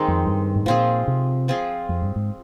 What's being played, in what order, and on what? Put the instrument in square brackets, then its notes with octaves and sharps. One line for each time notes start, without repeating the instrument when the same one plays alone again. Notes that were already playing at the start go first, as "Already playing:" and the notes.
Already playing: [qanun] D#3 G#3 C4 D#4
[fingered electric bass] F2
G2
G#2
[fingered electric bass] A#2 [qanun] F3 C4 F4 G#4
[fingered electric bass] C3
[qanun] F3 C4 F4 G#4
[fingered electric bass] F2
G2
G#2